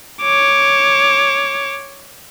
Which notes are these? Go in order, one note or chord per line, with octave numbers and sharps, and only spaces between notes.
C#5 D6